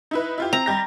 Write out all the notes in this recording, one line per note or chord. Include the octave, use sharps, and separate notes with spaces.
D#4 E4 B4
E4 F4 G4
C4 A#5
G3 G4 A#6